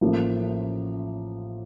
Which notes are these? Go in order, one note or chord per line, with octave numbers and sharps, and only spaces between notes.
A1 A2 F3 A#3